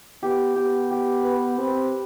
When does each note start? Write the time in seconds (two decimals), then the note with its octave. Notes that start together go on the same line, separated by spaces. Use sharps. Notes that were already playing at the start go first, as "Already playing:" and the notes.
0.23 B3 G4
0.56 B3 G4
0.91 G4
1.23 B4
1.57 C4 B4